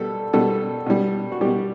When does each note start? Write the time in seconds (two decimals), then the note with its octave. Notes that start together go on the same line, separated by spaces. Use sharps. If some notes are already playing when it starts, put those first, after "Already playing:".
Already playing: B2 G3 A4
0.33 B2 G3 A4
0.86 B2 G3
1.32 F#4
1.41 B2 G3 G4